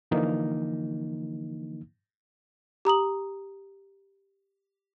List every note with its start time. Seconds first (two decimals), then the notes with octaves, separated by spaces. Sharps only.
0.11 D3 E3 F3 A#3 D#4
2.85 G4 A#5 D#6 F#7